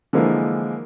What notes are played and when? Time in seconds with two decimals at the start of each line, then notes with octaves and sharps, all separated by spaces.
0.13 D3 E3 F3 G#3 A#3